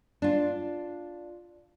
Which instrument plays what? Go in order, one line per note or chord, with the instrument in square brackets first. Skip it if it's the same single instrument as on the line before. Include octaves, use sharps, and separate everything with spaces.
[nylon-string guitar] D4 F4